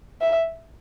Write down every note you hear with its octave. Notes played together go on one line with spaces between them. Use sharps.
E5